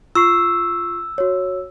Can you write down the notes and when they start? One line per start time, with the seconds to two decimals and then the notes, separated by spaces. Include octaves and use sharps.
0.15 F4 C#6 E6 C7
1.18 F#4 C#5